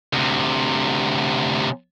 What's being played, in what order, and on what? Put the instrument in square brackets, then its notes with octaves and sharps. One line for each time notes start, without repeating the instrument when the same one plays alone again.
[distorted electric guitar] D2 C3